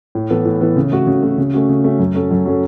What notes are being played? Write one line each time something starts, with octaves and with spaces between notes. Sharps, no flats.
A2
E3 B3 A4
A2
E3 B3 A4
C#3
A3 F#4
C#3
A3 F#4
C#3
A3 C#4 F#4
C#3
A3 C#4 F#4
F#2
F#3 C#4 A4
F#2
F#3 C#4 A4